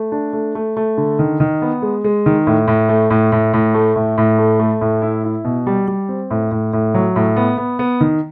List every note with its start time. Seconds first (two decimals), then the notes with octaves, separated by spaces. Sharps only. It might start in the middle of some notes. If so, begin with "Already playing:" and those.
Already playing: A3
0.12 D4
0.33 A3
0.55 A3
0.77 A3
0.98 D3
1.19 D#3
1.40 D#3
1.62 B3
1.82 G#3
2.04 G#3
2.26 D#3
2.47 A2
2.68 A2
2.89 A3
3.10 A2
3.32 A2
3.54 A2
3.74 A3
3.96 A2
4.18 A2
4.39 A3
4.59 A3
4.81 A2
5.02 E4
5.24 E4
5.45 B2
5.67 G3
5.88 G3
6.09 C4
6.31 A2
6.51 A2
6.73 A2
6.95 F#3
7.16 A2
7.36 B3
7.58 B3
7.79 B3
8.01 D#3